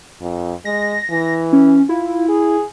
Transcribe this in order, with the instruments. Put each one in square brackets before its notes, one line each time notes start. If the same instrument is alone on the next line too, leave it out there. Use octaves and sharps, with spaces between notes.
[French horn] F2
[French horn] G#3 [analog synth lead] A#6
[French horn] E3
[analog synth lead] C#4
[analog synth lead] E4 [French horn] F4
[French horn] G#4